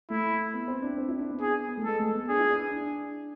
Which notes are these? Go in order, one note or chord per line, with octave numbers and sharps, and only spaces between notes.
A3 E4
B3
C4
D4
C4
E4
D4
B3
G#4
B3
A3
G#3 A4
A3
B3
D4 G#4
E4
D4
D4